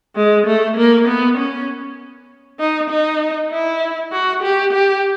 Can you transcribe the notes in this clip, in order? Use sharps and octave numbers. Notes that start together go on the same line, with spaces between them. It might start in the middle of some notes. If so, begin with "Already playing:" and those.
G#3
A3
A#3
B3
C#4
D#4
D#4
E4
F#4
G4
G4